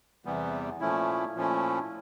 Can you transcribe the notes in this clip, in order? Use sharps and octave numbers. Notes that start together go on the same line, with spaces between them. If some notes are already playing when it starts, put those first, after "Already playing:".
E2 C3 E3 G3 B3
A#2 F3 A3 C#4 E4
A#2 F3 A3 C#4 E4